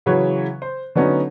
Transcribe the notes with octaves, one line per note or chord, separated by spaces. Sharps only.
C#3 E3 F#3 B4 C#5
C5
D3 F#3 B3 C#4 D#4